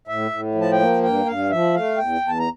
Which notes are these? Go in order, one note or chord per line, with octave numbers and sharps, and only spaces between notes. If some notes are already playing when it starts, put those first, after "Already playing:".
A2 E5
A2
F3
A5
G5
A#3
G2 G5
G2 F5
F3 E5
A3 F5
E2 G5
E2
A5
A#5